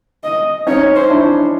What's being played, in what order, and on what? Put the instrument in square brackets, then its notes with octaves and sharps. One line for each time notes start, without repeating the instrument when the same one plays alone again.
[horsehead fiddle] D#5
[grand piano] C#4 D#4 [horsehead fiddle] C#5
[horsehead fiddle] C5
[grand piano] D4 E4